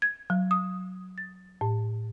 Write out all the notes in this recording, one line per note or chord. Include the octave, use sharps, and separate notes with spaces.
G#6
F#3
D#6
A6
A2